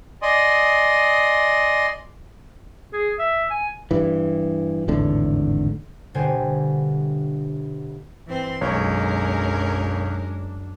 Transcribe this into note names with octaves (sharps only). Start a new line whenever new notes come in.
D5 D#5 G#5 C6 D#6
G#4
E5
G#5
G2 E3
G#1 E2 A2 D3
G1 B2 D3 C5 G5 G#5
G2 E3 C4 C6
B1 F#2 G#3 C#4 D4 A#4 C#5